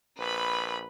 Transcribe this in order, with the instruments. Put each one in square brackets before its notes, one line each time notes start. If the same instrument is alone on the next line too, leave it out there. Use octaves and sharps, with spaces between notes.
[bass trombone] A#1 [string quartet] B4 B5